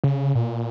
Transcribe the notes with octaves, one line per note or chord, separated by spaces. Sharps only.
C#3
A#2